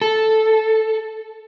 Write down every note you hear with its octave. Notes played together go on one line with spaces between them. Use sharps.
A4